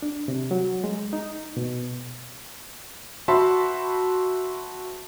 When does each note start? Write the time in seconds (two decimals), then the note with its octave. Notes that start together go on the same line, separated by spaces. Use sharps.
0.02 D4
0.28 C3
0.51 F#3
0.84 G#3
1.13 D#4
1.57 B2
3.28 F#4 C5 E5 A5 B5 C6